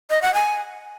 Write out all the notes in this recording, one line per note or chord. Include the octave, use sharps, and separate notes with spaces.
D#5
F#5
G#5